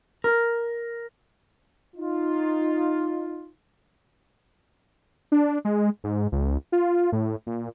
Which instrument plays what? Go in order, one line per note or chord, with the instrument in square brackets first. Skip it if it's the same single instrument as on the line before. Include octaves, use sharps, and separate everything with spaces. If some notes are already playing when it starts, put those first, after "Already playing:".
[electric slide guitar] A#4
[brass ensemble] D#4 F4
[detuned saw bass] D4
G#3
G#2
C#2
F4
A2
A#2